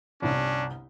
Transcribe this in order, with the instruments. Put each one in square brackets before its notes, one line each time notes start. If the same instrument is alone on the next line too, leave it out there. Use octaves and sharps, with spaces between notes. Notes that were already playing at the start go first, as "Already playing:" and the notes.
[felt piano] G1 C2 C3 [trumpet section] C#4 D4